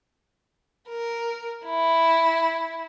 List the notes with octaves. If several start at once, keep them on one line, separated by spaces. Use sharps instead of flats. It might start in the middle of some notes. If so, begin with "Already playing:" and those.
A#4
E4